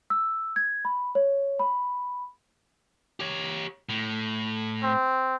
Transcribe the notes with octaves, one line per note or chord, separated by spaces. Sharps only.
E6
G#6
B5
C#5
B5
G4 C#5
A2
C4